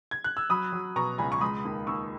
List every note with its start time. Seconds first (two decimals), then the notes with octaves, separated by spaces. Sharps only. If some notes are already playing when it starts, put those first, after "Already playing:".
0.11 G#6
0.24 F#6
0.37 E6
0.49 F#3 B5 D#6
0.72 F#3
0.96 B2 A#5 C#6
1.18 C#2 G#5 B5
1.32 C#6
1.41 G#3 B5 D#6
1.65 D#2
1.87 D#2 C#6 E6